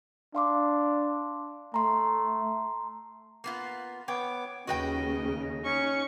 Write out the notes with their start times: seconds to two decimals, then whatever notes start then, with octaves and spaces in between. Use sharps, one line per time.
0.35 D4 F5 C6 D6
1.74 A3 A#5 C6
3.44 A#3 B3 F4
4.08 B3 C#5 G5 D6
4.67 D#2 C#3 F#4 B4 D#5 G5
5.64 C#4 D#4 C#6